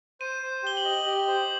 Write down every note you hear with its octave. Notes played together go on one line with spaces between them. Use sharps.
C5 D#7
C5
G4 G7
F#7
D#5
G4
C5